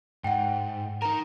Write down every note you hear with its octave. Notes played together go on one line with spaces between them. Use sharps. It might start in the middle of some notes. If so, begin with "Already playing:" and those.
G#2 F#5 G5
D#4 A#4 A#5